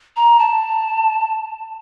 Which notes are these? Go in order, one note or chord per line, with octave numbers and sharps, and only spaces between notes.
A#5
A5